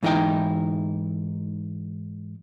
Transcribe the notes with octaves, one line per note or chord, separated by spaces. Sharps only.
G#2 E3 D#4 E4 G5